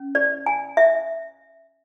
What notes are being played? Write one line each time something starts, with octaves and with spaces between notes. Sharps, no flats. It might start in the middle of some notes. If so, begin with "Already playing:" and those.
Already playing: C#4
D5
G#5
E5